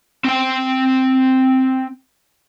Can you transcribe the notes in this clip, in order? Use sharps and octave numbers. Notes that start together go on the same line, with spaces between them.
C4 G5